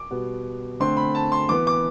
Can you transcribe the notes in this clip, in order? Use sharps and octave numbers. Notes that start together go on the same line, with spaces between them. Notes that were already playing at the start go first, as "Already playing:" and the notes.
Already playing: D6
B2 G3 B3
D3 A3 C4 C6
B5
A5
C6
E3 B3 D6
D6